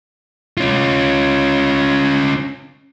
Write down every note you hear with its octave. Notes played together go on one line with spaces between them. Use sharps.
C#4 F4